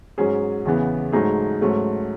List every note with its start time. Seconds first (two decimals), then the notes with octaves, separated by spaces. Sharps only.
0.18 G#2 F#3 C#4 G#4
0.65 E2 C#3 E3 B3
1.12 G#2 F#3 A3 D#4 G#4
1.61 G#2 F#3 A3 C#4